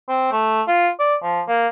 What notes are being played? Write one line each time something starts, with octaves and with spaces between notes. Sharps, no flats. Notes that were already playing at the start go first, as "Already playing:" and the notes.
C4
A3
F4
D5
F3
A#3